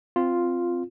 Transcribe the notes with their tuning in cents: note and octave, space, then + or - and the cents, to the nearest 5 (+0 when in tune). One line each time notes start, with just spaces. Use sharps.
C4 -5 F4 +0